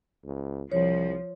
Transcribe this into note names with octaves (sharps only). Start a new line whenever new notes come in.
C#2
C2 F3 C#5